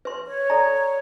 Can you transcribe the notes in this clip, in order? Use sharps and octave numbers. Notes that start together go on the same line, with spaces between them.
B4 C6
C#5
A4 D5 A#5